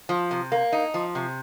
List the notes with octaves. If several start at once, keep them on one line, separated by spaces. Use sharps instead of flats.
F3
C3
A#3
D#4
F3
C3